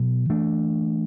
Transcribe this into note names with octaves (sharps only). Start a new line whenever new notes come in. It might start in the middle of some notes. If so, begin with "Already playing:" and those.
Already playing: B2 F#3 B3
E3 A3 D4